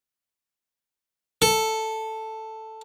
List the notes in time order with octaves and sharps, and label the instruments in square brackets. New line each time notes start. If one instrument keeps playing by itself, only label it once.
[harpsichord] A4